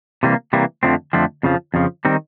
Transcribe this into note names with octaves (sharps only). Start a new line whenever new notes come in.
C3 E3 G3 A#3
C3 E3 G3 A#3
F2 D3 F3 A3 C4
F2 D3 F3 A3 C4
F2 C#3 F3
F2 C#3 F3
D#3 G3 C4 D#4